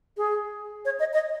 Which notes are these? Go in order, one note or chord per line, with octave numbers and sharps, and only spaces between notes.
G#4
C#5
D#5
D#5